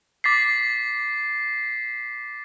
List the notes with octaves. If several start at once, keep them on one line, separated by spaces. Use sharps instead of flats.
D6 A6 B6 C7